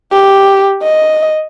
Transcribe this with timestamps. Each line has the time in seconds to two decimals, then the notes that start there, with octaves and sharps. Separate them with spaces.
0.12 G4
0.83 D#5